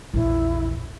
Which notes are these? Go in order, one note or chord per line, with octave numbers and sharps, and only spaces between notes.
A#1 E2 E4